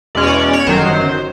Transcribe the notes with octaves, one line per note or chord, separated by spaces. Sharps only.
E2 B2 G#3 C#4 D5
C#5
D5
D5
C#5
G1 F#2 D#3 F#3 C5